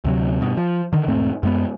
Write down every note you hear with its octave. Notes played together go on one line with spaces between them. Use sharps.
D2 C3 F#3
G2 B2
F3
D3 D#3
E1 G#2 A3 C4
F#2 G#3 B3